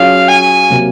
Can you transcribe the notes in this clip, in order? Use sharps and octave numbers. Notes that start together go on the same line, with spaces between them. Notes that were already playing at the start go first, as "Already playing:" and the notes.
Already playing: F#3 C#4 F4 G#4 F5
G#5
C3 F#3 A#3